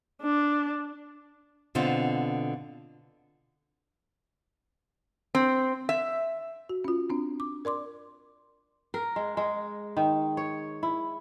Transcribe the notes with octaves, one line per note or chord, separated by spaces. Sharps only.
D4
B2 D3 C4 F4
C4
E5
F#4
C#4 F4
C4 D4
D6
A#4 D5 C6 D6
A#4
G#3
G#3
D#3
C#5
E4